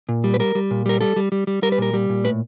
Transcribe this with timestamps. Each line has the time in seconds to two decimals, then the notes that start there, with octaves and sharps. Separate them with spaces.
0.09 A#2
0.24 G3
0.34 B4
0.40 G3 A#4
0.55 G3
0.71 A#2
0.86 G3 A#4
1.01 G3 A4
1.16 G3
1.32 G3
1.47 G3
1.63 G3 A#4
1.72 B4
1.78 A#2 A#4
1.94 G3
2.09 A#2
2.24 A2 B4